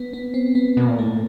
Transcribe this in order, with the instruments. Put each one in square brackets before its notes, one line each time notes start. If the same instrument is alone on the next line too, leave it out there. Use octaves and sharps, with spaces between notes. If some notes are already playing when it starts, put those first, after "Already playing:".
Already playing: [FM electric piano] B3
B3
C4
B3
[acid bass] B2 [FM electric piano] A#3
[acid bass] A#2
[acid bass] A2 [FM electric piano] A3